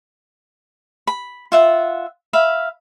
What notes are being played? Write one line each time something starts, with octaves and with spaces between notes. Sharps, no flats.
B5
F4 E5 F#5
E5 F5 B5